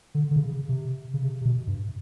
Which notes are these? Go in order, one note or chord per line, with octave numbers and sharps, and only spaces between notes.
D3
D3
C#3
C#3
C3
C#3
C3
C3
B2
G2